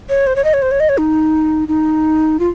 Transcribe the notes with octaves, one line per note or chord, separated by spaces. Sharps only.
C#5
C5
C#5
D#5
C#5
C5
C#5
D#5
C#5
D#4
D#4
F4